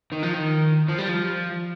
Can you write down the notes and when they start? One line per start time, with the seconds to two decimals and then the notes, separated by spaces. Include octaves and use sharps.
0.12 D#3
0.23 F3
0.34 D#3
0.88 F3
0.98 G3
1.09 F3